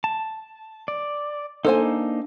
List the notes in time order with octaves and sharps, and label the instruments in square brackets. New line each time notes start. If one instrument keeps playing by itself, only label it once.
[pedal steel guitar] A5
D5
[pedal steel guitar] A#3 D4 D#4 [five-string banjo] A4 C5 G#5